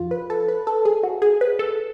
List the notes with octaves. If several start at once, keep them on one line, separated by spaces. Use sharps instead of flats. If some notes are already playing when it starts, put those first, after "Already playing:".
Already playing: F2 F3 F4
B4
A4
B4
A4
G#4
F#4
G#4
B4
A4